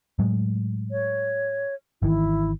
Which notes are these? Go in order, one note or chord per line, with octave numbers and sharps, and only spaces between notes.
A2 F#3 G#3
C#5
G#1 D#3 E3 E4